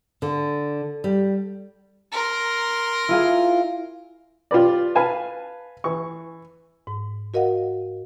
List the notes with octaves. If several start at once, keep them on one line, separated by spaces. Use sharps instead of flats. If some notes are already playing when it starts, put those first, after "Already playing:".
D3
G3
A#4 C6
E4 F4 G#4
F4 G4 B4 D5
B4 F5 G#5 A5
E3 C#6
G#2
F#4 A#4 D#5 F5 F#5